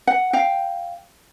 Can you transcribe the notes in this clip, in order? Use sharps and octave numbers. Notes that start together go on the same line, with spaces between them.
F#5
F5 G5